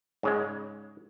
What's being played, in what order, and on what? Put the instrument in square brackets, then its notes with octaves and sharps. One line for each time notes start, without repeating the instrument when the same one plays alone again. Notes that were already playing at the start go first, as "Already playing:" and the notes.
[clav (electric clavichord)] G#2 C#3 G#3